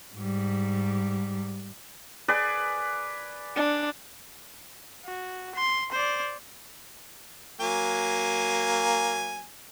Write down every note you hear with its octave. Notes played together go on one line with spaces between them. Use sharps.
G#2 G3
G#4 B4 D5
D4
F#4
C6
C5 D5
F#3 A#3 G#5